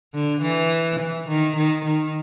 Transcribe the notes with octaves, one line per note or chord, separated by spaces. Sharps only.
D3
E3
E3
D#3
D#3
D#3